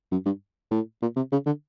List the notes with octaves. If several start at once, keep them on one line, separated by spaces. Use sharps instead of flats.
F#2
G2
A2
A#2
C3
C#3
D3